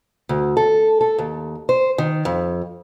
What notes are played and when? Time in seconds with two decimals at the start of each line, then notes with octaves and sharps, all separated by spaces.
0.29 D2
0.57 A4
1.01 A4
1.18 D#2
1.69 C5
1.98 D#3
2.25 F2